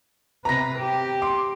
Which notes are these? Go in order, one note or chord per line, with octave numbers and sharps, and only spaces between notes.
C3 B4 A#5 A#6
G4
C6 D6